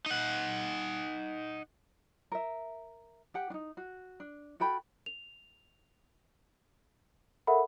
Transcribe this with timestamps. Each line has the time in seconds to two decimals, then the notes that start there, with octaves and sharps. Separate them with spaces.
0.06 D#4 F#5
2.32 A#4 E5
3.34 G4 F#5 G5
3.50 D4 D#4
3.77 F#4
4.20 D4
4.60 F#4 A4 G5 B5
5.06 F7
7.47 A4 A#4 E5 F#5 B5